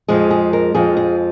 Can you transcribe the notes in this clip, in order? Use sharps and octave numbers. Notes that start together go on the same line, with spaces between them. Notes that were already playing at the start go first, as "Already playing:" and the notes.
F2 F3 G#3 G#4
G#4
A#4
F2 F3 G#3 G#4
G#4